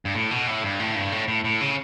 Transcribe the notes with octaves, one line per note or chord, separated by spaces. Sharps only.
G2
A2
B2
A2
G2
A2
G2
A2
A2
A2
C#3